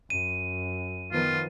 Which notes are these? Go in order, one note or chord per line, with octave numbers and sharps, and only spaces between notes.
F#2 D#7
D#3 F3 B3 F4